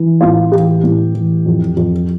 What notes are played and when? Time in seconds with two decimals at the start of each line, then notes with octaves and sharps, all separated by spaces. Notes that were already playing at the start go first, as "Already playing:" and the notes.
Already playing: E3
0.21 A2 F4
0.52 E3 G4
0.83 A2
1.14 E3
1.46 F2
1.77 F2